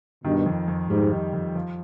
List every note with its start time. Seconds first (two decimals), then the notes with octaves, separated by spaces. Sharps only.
0.24 G2 B2 D#3
0.46 F2
0.68 F2
0.89 G#2 G3
1.11 D#3
1.33 F2
1.55 F3